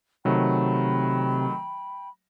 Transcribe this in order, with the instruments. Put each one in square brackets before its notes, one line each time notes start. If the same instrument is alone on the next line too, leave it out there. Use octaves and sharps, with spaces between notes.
[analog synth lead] C3 [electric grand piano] D#3 F#3 A3 [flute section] G5 B5